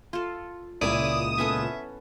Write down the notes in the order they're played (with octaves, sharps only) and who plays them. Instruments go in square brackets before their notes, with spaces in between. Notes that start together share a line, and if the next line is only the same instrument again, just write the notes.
[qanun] F4 A4
[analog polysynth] C#2 A#2 E7 [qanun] E4 C#5 [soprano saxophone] D5 [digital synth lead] D#6
[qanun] B3 C#4 A4 [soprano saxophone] E5